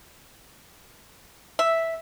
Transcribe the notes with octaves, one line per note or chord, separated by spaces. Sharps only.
E5